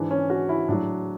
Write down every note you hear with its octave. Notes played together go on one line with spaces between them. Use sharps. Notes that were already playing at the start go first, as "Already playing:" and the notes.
Already playing: G#2 E3 D4
C#4
F#4
E4
A2 F#3 D4